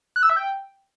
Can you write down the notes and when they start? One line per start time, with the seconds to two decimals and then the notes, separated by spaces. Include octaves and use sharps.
0.16 F#6
0.23 E6
0.30 E5
0.36 G5